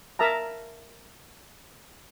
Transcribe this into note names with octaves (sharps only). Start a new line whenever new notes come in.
A#4 E5 A5 A#5